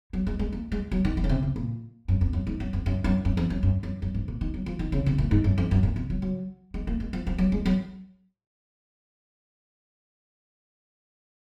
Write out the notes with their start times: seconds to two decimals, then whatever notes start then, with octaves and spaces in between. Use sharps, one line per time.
0.13 F#3
0.27 G#3
0.39 G#3
0.52 A#3
0.72 G#3
0.91 F#3
1.05 D#3
1.17 D#3
1.24 C#3
1.29 C3
1.43 C3
1.56 A#2
2.08 F#2
2.21 F2
2.33 F#2
2.47 G#2
2.60 F#2
2.73 F2
2.86 F#2
3.04 F#2
3.25 F#2
3.37 F2
3.50 F#2
3.63 F#2
3.83 F#2
4.02 F#2
4.14 G#2
4.28 A#2
4.41 D#3
4.54 F#3
4.66 F3
4.79 D#3
4.92 C#3
5.06 C3
5.18 A#2
5.31 G#2
5.44 F#2
5.58 F2
5.71 F#2
5.83 A#2
5.96 C3
6.10 F#3
6.22 F#3
6.74 G#3
6.87 A#3
7.00 G#3
7.13 F3
7.27 F3
7.38 F#3
7.52 G#3
7.66 F#3